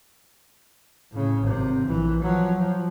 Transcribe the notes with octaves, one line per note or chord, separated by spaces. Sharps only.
A2 C#3
G#1 C3
A#1 E3
F3 F#3
F3